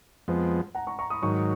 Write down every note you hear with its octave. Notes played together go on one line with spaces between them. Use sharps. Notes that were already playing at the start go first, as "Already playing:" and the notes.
F2 F3 G#3 B3
F#5 A#5
A#5 C#6
A#5 C#6
B5 D#6
G#2 D#3 F#3 A#5 C#6